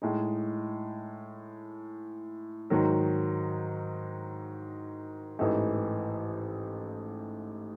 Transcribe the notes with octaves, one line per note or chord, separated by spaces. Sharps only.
A2 G#3 D#4
G#2 D#3 F#3
A1 G#2 E3 A3 D#4